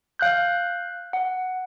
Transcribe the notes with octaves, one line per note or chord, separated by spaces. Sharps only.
F5 F#6 G6
F#5